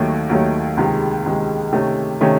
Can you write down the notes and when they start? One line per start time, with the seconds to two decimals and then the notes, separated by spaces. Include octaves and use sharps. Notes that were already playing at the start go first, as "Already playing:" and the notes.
Already playing: D#2 D#3 F#3 A3
0.30 D#2 D#3 F#3 A3
0.77 C#2 C3 D#3 G#3
1.25 C#2 C3 D#3 G#3
1.73 C3 D#3 A3 C#4
2.21 C3 D#3 A3 C#4